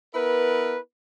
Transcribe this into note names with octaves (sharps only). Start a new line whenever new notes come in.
B3 E4 A#4 B4